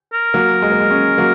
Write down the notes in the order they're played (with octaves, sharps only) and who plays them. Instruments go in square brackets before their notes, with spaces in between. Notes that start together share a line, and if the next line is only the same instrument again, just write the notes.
[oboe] A#4
[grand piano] F#3 A#3
G#3
A#3
G#3
G#3 C#4
F#3 A#3